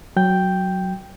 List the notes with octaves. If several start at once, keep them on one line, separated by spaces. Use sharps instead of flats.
F#3 G5 G6